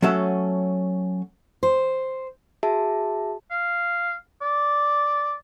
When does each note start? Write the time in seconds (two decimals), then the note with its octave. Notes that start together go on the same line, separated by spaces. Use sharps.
0.02 F#3 A3 C#4 A4 E5 F#5
1.63 C5
2.63 F#4 G#4 E5 A5
3.51 F5
4.42 D5